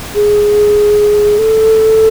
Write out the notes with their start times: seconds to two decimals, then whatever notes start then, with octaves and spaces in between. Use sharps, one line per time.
0.15 G#4
1.39 A4